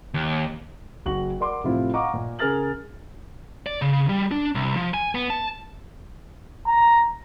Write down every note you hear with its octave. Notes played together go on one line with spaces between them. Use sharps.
D#2
F#1 F#4 F#5 F#7
A#4 D5 F#5 C6 D6
A2 C3 F3 C4 E4 F4
D#5 F5 F#5 A#5 C#6 D6
A#2
C#3 G#4 A#4 F6 A6 F#7
D5
C#3
G3
D4
C2
F3
G#5
B3
A5
A#5